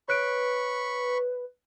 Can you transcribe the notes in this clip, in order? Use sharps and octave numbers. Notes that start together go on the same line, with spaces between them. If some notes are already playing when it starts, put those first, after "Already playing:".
B4 C#5 B5 C#6 F#6 D7